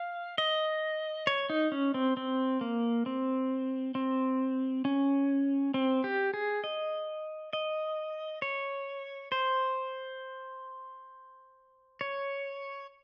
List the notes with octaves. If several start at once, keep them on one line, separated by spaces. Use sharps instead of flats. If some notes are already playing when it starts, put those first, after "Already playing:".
Already playing: F5
D#5
C#5
D#4
C#4
C4
C4
A#3
C4
C4
C#4
C4
G4
G#4
D#5
D#5
C#5
C5
C#5